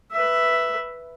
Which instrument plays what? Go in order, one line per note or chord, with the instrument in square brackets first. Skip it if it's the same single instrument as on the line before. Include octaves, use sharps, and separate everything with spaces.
[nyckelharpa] B4 E5